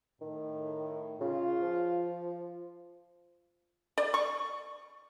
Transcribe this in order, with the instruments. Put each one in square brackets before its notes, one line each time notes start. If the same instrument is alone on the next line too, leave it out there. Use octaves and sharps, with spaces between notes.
[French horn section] A2 [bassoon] D#3
[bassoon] C#3 [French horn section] F4
[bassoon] F3
[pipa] D5
C#6